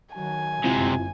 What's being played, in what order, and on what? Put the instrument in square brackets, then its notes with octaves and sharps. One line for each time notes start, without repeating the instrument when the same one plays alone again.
[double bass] D#3 F#3 [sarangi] G#5
[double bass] G1 F#2 [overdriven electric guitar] C3 G#3 [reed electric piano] C4 E4 F4